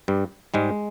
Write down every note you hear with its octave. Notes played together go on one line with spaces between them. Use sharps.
G2 G3
G#2 G3 G#3